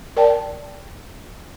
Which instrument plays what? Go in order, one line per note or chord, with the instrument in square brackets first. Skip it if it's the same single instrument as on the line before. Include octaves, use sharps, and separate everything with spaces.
[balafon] A#4 D5 G5 A5